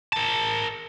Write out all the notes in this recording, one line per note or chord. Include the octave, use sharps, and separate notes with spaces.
A#4 A5